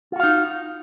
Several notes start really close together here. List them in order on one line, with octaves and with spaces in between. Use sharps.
F4 F#4 F5 D#4